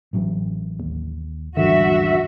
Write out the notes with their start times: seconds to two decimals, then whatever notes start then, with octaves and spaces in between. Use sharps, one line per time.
0.13 A1 F#3
0.80 D#2
1.57 G#1 E2 D3 G3 F#4 E5